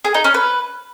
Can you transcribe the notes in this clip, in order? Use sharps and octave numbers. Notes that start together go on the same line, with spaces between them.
G#4
D#4
C#4
B4